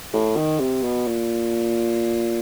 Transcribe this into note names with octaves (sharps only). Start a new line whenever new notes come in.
A2
D#3
C3
B2
A#2